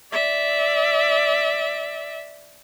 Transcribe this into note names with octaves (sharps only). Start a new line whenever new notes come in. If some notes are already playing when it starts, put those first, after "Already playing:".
D5 E5